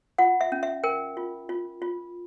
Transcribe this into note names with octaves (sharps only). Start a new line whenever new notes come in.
F4 F#5
E5
C#4
E5
A#4 G5
F4
F4
F4